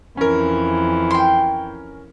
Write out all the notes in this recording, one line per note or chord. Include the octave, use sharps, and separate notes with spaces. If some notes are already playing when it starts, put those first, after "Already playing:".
F2 E3 C#4 A#4
G5 C6